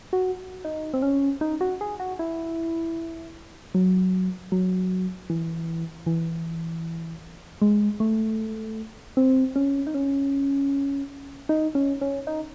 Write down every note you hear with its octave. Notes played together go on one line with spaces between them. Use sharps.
F#4
D#4
C4
C#4
D#4
F#4
G#4
F#4
E4
F#3
F#3
E3
E3
G#3
A3
C4
C#4
D#4
C#4
D#4
C#4
C#4
D#4